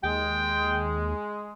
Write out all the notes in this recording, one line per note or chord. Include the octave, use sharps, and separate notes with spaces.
D#2 G#3 G5